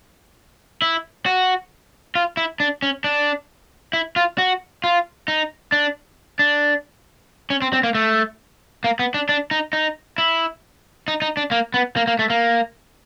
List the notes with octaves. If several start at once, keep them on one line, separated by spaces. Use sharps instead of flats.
E4
F#4
F4
E4
D4
C#4
D4
E4
F4
F#4
F4
D#4
D4
D4
C#4
C4
C4
A#3
A3
A#3
B3
D4
D4
D#4
D#4
E4
D#4
D#4
D4
A#3
B3
A#3
A#3
A3
A#3